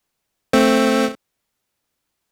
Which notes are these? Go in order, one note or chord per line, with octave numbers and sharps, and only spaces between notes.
A3 C4